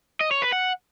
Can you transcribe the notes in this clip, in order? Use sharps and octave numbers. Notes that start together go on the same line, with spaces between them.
D#5
C#5
B4
F#5